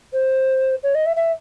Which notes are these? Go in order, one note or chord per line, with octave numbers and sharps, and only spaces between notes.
C5
C#5
D#5
E5
E5